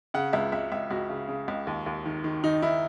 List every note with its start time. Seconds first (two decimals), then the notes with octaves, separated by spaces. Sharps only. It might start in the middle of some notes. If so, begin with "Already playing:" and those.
0.14 C#3 F#5
0.33 C#2 E5
0.52 C#2 E5
0.72 C#2 E5
0.90 C#2 F#4
1.10 C#3
1.29 C#3
1.48 C#2
1.67 D#2
1.86 D#2
2.06 D#3
2.24 D#3
2.43 D#3 D#4
2.62 D#3 E4